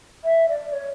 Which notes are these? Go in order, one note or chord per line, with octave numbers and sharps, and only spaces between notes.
E5
D5
C#5